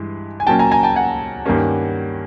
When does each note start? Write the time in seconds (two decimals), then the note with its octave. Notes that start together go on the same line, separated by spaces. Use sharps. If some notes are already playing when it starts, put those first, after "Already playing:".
Already playing: G2 E3 G#3
0.40 G#5
0.47 A#2 F#3 A#3 C#4 G5 A5
0.59 G#5 A#5
0.71 G#5 A#5
0.83 G5 A5
0.96 F#5 G#5
1.46 G2 D#3 G3 A#3 C#4